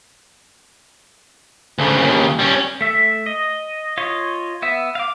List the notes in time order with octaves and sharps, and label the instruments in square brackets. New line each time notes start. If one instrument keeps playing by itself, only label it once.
[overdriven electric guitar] D2 C#3
D#2 C#3
G3 C#4
[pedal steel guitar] A3 E5
D#5
F4 C#5 D#5
B3 E5
F5 D6